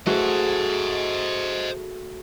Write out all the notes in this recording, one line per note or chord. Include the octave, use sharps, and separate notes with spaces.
A3 F#4 G#4 C5 D#5